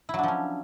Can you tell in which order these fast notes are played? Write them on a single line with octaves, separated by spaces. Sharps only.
E4 F#3 D4 F3 C#4